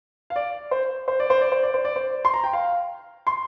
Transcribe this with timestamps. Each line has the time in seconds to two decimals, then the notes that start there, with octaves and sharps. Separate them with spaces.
0.30 F5
0.36 D5
0.71 C5
1.08 C5
1.20 D5
1.30 C5
1.41 D5
1.52 C5
1.63 D5
1.74 C5
1.85 D5
1.96 C5
2.25 C6
2.34 A#5
2.44 G5
2.53 F5
3.27 C6